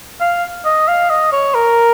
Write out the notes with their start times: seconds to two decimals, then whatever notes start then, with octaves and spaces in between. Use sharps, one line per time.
0.21 F5
0.65 D#5
0.88 F5
1.10 D#5
1.32 C#5
1.55 A#4